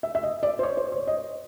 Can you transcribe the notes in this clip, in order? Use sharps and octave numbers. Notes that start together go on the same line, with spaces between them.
E5
E5
D#5
D5
C5
C#5
C5
C#5
D#5